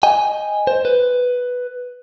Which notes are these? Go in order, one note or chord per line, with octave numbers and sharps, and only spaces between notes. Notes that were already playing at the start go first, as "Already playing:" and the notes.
D#5 G5 G#5
C5
B4